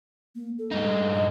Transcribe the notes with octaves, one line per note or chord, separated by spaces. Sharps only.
A#3
A4
G2 D#4
D#5